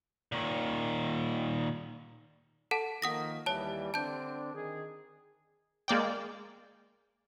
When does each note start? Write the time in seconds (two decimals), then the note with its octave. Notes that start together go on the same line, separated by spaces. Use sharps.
0.32 A#2 D#3
2.71 A4 F#5 A5
3.02 D#3 F3 A#3 F#5 D#6 A#6
3.46 D#2 E3 G3 C#5 A5
3.94 D3 C4 D4 A5 G6
4.53 D#3 G#4
5.88 G#3 A#3 D5 G5